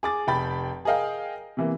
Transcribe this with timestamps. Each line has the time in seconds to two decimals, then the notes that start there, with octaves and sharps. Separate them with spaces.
0.03 G#4 D6 A6
0.27 F1 G5 B5 A6
0.85 G#4 A#4 D#5 F5 G5
1.57 C3 E3 A#3